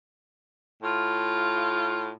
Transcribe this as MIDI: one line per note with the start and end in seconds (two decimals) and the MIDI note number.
0.83 2.11 45
0.83 2.11 65